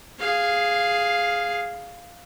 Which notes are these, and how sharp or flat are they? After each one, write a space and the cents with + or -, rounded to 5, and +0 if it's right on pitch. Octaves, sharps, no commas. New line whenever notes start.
G#4 +0 F5 +0